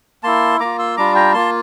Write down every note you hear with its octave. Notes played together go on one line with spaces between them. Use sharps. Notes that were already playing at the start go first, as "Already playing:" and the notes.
A#3 E4 A5 C6
A#3 F4 A#5 D6
C6 E6
G3 D4 F4 A#5 D6
G5 A#5
A#3 F4 A5 C6